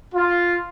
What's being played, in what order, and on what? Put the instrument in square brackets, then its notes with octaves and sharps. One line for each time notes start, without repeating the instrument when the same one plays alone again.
[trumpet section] F4